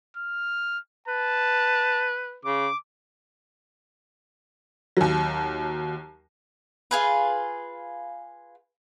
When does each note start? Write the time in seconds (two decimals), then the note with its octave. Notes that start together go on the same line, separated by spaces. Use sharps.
0.17 F6
1.08 B4 A5
2.45 C#3 D6
4.97 D#2 F#3
6.91 F4 G#4 B4